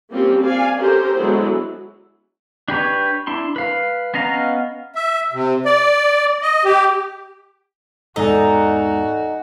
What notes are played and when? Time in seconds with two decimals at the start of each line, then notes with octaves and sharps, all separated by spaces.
0.11 G3 A#3 C4 C#4 F4 G4
0.43 D5 F5 G#5
0.76 C#4 G4 A4 A#4 C5
1.16 D3 F#3 G#3 B3 E4
2.68 D4 G4 B4 C#5
3.27 D4 E4 C6
3.56 B4 F5
4.14 B3 C#4 D#5 F5 A#5
4.95 E5
5.33 C3
5.65 D5
6.42 D#5
6.64 G4
8.16 E2 G#2 D#4 F#4 A4 D5 G#5